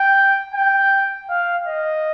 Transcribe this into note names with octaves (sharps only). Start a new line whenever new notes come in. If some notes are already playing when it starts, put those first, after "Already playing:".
Already playing: G5
G5
F5
D#5